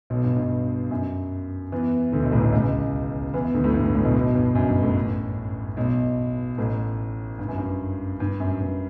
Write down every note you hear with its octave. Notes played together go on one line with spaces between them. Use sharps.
B1 B2
G2
G2
F#2
E2 E3
D2 D3
B1 B2
A1 A2
B1 B2
C#2 C#3
E2 E3
E2 E3
D2 D3
A1 A2
G2
G2
A1 A2
B1 B2
B1 B2
G2
F#2
G2
A1 A2
B1 B2
A1 A2
G2
F#2
G2
G2
F#2
G2